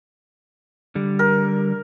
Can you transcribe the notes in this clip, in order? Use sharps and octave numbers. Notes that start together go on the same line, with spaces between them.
D3 G3
A#4